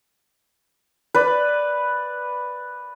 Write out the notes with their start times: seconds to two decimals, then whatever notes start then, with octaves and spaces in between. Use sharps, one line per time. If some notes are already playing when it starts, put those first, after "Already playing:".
1.14 B4 D5